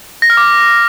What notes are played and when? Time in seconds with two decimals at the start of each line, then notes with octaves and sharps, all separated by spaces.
0.22 A#6
0.30 F6
0.37 D6